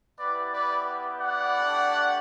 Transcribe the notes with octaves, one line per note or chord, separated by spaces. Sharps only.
B3 E4 G4 B4 D5
B4 D5
D5 F#5
A3 D4 G4